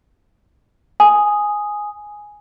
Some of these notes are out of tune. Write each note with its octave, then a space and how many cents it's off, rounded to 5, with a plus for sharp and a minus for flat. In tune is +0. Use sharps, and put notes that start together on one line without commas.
G#5 +0 D#6 +0